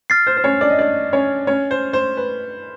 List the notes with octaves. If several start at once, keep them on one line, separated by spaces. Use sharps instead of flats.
F6 A6 C7
C5
C5
C#4 C#5
D4 D5
D#5
D4 D5
C#4 C#5
C#4 C#5
C5
C5
B4